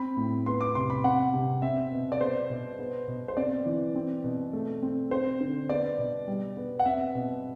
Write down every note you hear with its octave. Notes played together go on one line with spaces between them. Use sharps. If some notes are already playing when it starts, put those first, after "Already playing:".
Already playing: C4 B5
A2
B3 C6
D6
C3 C6
B5
C4 F#5
C3
C4 E5
B2
D5
B3 C5
B2
B3
B2
C5
C4 D5
E3
C4
B2
A3
C4
C4 C5
D3
B3 D5
B2
G3
B3
F#5
C4 E5
B2